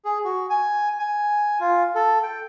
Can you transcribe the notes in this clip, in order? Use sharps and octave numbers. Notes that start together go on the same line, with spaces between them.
G#4
F#4
G#5
G#5
F4
A4
G5